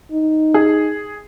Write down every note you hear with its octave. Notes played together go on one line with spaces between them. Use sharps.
D#4
G#4